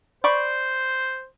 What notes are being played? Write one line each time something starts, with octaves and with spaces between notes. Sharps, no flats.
C5 D5 B5 C#6